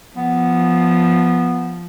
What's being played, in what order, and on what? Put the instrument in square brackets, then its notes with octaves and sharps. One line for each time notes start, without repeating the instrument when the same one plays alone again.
[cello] F3 [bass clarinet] B3